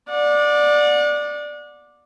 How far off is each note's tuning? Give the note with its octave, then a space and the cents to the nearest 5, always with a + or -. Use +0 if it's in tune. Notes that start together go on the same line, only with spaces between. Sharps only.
D5 +5 F#5 -35